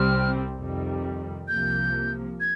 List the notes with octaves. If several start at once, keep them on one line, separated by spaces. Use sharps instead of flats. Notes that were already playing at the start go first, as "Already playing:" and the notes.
Already playing: C2 C3 G3 C4 F6
F2 C3 D#3 G3
C2 C3 F3 A#3 G6
G#6